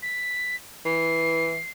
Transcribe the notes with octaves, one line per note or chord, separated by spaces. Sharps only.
B6
E3 C7